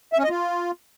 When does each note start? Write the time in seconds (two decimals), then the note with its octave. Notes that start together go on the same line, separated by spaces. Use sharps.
0.13 E5
0.18 C#4
0.24 D#5
0.29 F4